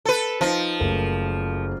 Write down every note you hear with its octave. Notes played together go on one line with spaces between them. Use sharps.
A4 B4
F3 D#4 A#6
F#1 A3 A#4